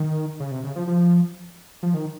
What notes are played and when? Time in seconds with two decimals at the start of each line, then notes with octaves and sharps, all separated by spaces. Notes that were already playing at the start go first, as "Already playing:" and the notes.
Already playing: D#3
0.40 C#3
0.51 C3
0.64 C#3
0.76 F3
0.87 F3
1.83 F3
1.94 D#3